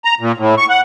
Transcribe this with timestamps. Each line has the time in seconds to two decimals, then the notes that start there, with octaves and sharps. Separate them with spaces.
0.05 A#5
0.20 A#2
0.38 A2
0.58 C#6
0.70 F#5